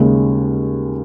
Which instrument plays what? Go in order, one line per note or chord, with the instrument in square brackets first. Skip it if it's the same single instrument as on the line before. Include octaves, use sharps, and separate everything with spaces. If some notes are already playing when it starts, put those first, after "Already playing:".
Already playing: [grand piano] D#2 C#3 G#3